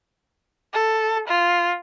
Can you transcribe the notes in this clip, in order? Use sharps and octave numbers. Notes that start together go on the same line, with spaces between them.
A4
F4